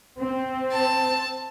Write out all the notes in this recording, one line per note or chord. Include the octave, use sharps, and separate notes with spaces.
C4
A5